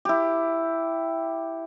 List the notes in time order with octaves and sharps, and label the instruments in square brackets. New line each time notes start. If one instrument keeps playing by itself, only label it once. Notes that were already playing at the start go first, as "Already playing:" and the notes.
[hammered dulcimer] E4 G4